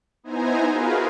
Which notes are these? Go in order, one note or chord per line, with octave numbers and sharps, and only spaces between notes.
B3 D#4 E4 C5 G#5 A#5
F4 F#4 G#4 A#4 B4 F5